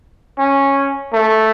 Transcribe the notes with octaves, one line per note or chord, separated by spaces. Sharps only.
C#4
A3